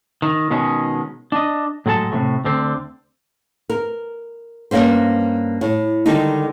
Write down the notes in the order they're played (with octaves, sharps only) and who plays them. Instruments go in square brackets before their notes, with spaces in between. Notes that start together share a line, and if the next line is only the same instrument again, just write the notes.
[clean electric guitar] D#3
B2 D#3 G#3 C#4
D4 D#5
A2 F#3 G#3 A4 A5
A2 C3 F#3 A3
D2 D3 C4
[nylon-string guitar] A#4
G2 C3 A#3 C#4 C5
A2
D3 D#3 G3 G#3 D#4